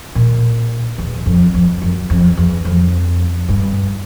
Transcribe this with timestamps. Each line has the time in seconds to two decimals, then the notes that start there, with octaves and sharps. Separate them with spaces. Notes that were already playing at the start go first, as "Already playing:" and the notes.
0.15 A#2
0.98 E2
1.26 F2
1.54 F2
1.82 F#2
2.10 F2
2.37 E2
2.65 F2
3.49 G2